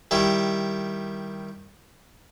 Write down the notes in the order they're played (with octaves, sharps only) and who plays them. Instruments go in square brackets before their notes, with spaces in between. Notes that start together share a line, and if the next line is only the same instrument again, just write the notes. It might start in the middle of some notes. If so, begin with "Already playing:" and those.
[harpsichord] D#3 G3 E4